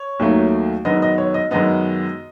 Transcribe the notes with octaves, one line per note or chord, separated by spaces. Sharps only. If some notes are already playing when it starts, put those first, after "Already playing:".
Already playing: C#5
D#2 D#3 F#3 A3
F#2 D#3 G#3 B3 D#5
D#5
C#5
D#5
F#2 D#3 G#3 B3 D#5